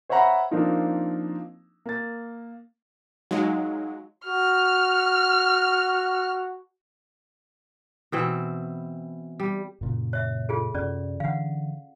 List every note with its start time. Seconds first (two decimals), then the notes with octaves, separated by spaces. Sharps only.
0.09 C5 C#5 E5 F#5 A#5 B5
0.51 F3 A#3 C4 D4 D#4 F4
1.86 A#3 A6
3.31 F#3 G#3 D#4 F5
4.27 F#4 F6
8.12 B2 E3 C4
9.40 G3
9.81 F#2 A#2 C#3
10.13 C#5 E5
10.49 F4 G#4 A4
10.74 F#2 C3 C#4 D5
11.20 D3 E3 F5 F#5